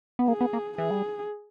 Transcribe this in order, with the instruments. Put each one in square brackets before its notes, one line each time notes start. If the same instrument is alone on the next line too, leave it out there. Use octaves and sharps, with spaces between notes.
[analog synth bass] B3
[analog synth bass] A#3 [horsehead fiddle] G#4
[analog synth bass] B3
A#3
[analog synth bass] E3 [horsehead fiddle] G#4
[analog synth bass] G3